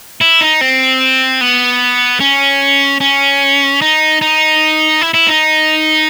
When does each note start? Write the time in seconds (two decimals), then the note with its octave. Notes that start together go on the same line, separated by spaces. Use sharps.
0.21 E4
0.41 D#4
0.61 C4
1.41 B3
2.20 C#4
3.01 C#4
3.82 D#4
4.21 D#4
5.02 E4
5.14 E4
5.28 D#4